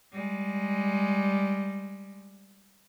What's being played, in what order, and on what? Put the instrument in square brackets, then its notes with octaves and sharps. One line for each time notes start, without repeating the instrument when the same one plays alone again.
[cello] G3 G#3